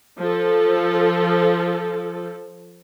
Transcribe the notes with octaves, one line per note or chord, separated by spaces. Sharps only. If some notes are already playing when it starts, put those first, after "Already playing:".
F3 A4